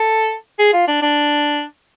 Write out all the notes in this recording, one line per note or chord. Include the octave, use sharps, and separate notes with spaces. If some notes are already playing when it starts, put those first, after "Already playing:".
Already playing: A4
G#4
F4
D4
D4